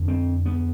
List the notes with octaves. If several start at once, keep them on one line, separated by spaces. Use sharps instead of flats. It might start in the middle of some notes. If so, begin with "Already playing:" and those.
Already playing: F2 D3
C4
B3